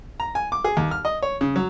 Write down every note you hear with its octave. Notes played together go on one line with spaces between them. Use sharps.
A#5
G#5
D6
G#4
D#2
F6
D#5
C#5
C#3
F#3